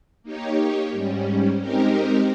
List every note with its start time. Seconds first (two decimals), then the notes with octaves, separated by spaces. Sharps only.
0.23 A#3 D#4 G4 C#5
0.91 G#2 G3 C#4
1.60 G#3 C4 D#4 G4 A#4